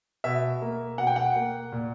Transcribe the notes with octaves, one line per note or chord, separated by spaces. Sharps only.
B2 E5
A#3
B2 F#5
G5
F#5
A#3
A#2